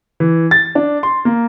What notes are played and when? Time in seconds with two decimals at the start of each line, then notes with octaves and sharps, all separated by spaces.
0.20 E3
0.51 A6
0.75 D4
1.03 C6
1.25 A#3